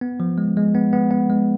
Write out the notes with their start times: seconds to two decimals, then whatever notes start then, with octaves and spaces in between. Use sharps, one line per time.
0.01 B3
0.20 F3
0.38 G#3
0.57 G#3
0.75 B3
0.93 B3
1.11 B3
1.30 G#3